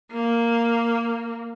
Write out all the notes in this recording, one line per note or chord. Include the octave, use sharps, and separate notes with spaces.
A#3